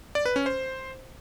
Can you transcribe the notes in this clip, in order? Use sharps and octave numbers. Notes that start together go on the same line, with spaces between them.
D5
B4
C#4
C5